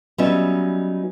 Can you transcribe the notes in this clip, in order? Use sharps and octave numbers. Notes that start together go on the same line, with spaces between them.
F#3 G3 B3 C#4 D#4 E5